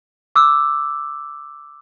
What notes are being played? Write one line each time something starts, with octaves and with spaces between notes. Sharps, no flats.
D6 E6